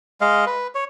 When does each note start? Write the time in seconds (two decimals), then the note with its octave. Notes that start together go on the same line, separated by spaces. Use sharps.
0.21 G#3 D#5 F5
0.46 B4
0.75 C#5